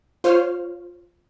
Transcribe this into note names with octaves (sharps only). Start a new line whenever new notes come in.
F4 C5 C#5 F5 F6